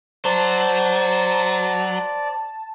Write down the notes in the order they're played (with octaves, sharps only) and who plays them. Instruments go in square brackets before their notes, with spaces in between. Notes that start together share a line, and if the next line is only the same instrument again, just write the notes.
[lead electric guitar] F#3 [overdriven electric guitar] C5 [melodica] D5 [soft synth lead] A5